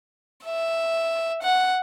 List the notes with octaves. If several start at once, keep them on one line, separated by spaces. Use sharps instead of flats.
E5
F#5